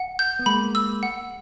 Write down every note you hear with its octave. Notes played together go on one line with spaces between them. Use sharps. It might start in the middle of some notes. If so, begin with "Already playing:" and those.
Already playing: F#5
G6
B3
G#3 A#3 B5
E6
F#5